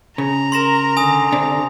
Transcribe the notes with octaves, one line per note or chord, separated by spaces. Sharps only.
C#3 A#5
A#4 C6 A#6 E7
D3 G#5 D#6
C3 D4